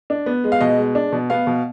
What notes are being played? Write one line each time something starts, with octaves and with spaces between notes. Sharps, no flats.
D4
B3
G#3
F5
B2 D#5
G#3
D4
B2
B3 F5
B2